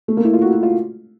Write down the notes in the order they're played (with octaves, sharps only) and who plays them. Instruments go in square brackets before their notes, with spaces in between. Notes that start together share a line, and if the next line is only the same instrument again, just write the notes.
[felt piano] A3
A#3
E4
F4
F#4
F#4
F4